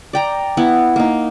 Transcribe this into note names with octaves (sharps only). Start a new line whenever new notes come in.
D5 G5 A#5
B3 E4 F#5
A#3 D#4